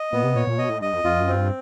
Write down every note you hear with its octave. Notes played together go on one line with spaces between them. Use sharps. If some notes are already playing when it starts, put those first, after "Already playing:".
Already playing: D#5
A#2 B3
C3
A#2 C#5
A#2
B2 D#5
A2
G2 D#5
F2
F2 F4
F#2
C4
G2